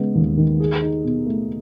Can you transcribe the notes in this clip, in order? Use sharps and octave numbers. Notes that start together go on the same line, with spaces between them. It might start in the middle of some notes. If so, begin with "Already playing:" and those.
Already playing: C#3 G#3 B3
D#2
D#3
G#4
D#4
B2
A3